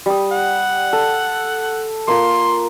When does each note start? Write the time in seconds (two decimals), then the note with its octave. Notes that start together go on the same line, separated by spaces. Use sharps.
0.06 G3 D#6
0.31 F#5
0.93 A4
2.08 A#3 F4 C6